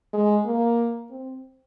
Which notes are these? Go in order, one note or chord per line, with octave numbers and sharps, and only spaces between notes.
G#3
A#3
C4